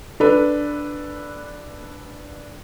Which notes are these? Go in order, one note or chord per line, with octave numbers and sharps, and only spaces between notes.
D4 A4 B4